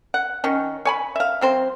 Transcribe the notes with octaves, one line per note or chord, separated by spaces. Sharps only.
F#5
D#3 C#4
C#5 G#5 B5
E5 F5
F#3 C4 C5